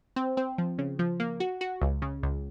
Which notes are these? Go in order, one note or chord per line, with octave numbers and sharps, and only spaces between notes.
C4
C4
F3
C#3
F3
A#3
F#4
F#4
C#2
C#3
C#2